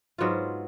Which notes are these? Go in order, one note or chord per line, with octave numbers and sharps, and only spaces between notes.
G#2 F#3 B3 F4